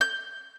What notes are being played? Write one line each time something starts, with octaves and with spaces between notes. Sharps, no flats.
G6